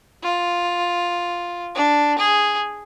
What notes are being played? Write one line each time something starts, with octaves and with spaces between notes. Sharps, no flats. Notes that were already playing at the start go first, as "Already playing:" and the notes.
F4
D4
G#4